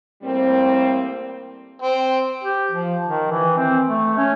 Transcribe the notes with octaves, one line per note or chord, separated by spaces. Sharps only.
A2 G3 A#3 C4
C4
G4
F3
D#3
E3
C4
A3
C#4